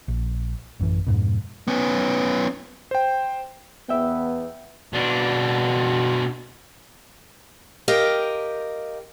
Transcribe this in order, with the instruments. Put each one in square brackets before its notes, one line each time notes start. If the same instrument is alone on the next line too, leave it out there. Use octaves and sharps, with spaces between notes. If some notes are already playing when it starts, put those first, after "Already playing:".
[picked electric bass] A#1
A1 F#2 A2 E3
F2 G#2 B2
[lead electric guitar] B3 C#4
[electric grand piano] C5 G5
[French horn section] E2 B3 [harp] E5 G5
[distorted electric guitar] B2 D4
[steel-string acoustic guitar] G4 A#4 D#5 F5 G5